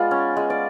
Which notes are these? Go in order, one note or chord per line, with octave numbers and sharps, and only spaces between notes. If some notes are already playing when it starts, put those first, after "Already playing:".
Already playing: G#3 B3 F4 D5
C#4
G#3
D5